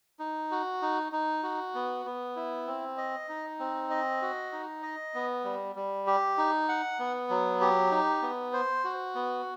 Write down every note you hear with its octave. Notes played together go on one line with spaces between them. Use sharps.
D#4
F#4
D#4
D#4
F#4
B3
B3
E4
C4
D#5
D#4
C4
D#5
F#4
D#4
D#5
B3
G3
G3
G4
D#4
F#5
B3
F#3
G4
D#4
B3
C5
F#4
B3